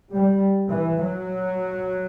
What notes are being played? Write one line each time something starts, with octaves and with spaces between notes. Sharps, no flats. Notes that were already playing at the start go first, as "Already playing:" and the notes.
G3
E3
F#3